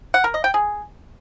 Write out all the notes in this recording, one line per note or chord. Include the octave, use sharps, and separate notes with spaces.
F#5
A#4
D#5
G5
G#4